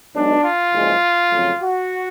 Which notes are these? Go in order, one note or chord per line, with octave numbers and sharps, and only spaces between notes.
B1 B2 G#3 D4
F4
F#1 F#2 C#3 F3 G#3
F2 C#3 F#3 A3
F#4